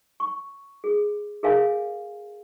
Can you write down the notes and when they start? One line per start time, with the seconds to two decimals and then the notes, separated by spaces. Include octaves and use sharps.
0.20 C#6
0.84 G#4
1.43 G#4 A#4 C#5 E5 F5 G#5